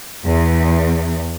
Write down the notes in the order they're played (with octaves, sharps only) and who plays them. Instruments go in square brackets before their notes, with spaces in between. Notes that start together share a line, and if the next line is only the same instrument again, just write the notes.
[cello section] E2